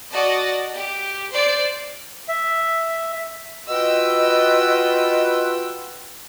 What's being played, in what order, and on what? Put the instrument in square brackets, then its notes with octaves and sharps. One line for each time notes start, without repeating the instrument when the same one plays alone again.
[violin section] F#4 D5 D#5 A5
G4
C5 D5
[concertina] E5
[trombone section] F4 F#4 B4 [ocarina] D#5 [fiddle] G5 E6